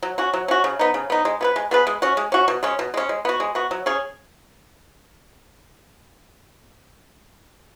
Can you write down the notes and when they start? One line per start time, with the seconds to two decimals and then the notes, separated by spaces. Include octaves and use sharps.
0.03 F#3
0.18 C#4 F#4
0.34 F#3
0.48 C#4 F#4
0.64 C#3
0.79 B3 D#4
0.94 C#3
1.10 B3 D#4
1.25 G#3
1.41 B3 G#4 B4
1.56 G#3
1.71 B3 G#4 B4
1.87 G#3
2.02 C#4 F#4
2.17 G#3
2.32 C#4 F#4
2.48 B2
2.63 G#3 C#4
2.79 B2
2.94 G#3 C#4
3.09 G#3
3.25 B3 F#4
3.40 G#3
3.55 B3 F#4
3.71 F#3
3.86 C#4 G#4